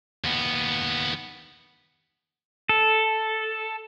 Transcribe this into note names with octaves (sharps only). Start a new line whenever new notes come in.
D#2 B3
A4